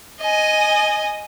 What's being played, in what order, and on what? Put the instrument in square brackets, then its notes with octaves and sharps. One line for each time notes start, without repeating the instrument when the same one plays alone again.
[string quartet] D#5 G#5